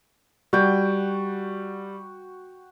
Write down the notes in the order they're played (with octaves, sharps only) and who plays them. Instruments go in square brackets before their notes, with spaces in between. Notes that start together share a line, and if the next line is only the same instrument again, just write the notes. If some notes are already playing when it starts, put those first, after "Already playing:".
[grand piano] G3 [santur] F#4 G5